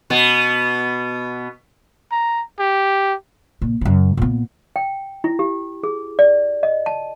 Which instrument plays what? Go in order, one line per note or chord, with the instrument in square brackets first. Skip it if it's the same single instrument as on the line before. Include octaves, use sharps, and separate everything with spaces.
[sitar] B2 B3
[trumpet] A#5
G4
[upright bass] A#2
F#2 C#3
A#2 B3
[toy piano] G5
E4
G4
G#4
D5
D#5
A5